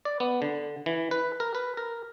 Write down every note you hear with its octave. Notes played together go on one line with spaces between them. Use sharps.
D5
B3
D3
E3
B4
A#4
B4
A#4